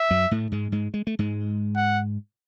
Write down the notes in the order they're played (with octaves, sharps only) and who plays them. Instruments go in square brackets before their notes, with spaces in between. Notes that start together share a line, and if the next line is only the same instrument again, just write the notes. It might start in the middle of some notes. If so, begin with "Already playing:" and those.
Already playing: [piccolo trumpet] E5
[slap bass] F#2 F#3
A2 A3
G#2 G#3
G#2 G#3
G#3
A3
G#2 G#3
[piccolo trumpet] F#5